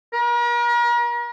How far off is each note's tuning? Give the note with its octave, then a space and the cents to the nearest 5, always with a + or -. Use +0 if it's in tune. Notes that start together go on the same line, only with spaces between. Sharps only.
A#4 +40